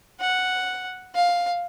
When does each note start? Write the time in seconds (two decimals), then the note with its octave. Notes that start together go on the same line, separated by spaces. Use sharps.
0.20 F#5
1.15 F5